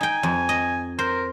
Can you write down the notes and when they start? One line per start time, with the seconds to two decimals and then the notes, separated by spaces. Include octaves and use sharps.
0.01 D#4 G5 G#5
0.23 F2
0.49 D#5
0.99 A#4 C5